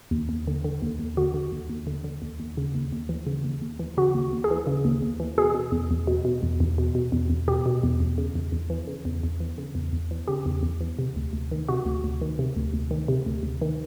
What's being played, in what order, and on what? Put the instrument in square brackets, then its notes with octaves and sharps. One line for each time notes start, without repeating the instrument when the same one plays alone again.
[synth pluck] D#2
D#2
D3
D3
D#2
D#2
D3 F#4
D3
D#2
D#2
D3
D3
D#2
D#2
C#3
D#2
D#2
E3
C#3
D#2
D#2
E3
C#3 F#4
D#2
D#2
G#4
E3
C#3
D#2
D#2
E3
B2 G#4
B2
E2
E2
B2
B2
E2
E2
B2
B2
E2
E2
B2 G4
B2
E2
E2
C#3
E2
E2
E3
C#3
E2
E2
E3
C#3
E2
E2
E3
C#3 G4
E2
E2
E3
C3
D2
D2
D#3
C3 F#4
D2
D2
D#3
C3
D2
D2
D#3
C3
D2
D2
D#3